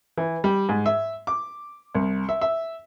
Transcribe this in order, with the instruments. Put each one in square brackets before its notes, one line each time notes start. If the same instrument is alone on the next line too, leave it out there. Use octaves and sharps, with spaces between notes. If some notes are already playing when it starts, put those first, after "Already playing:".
[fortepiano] E3
G3
G#2
E5
D6
C2
E5
E5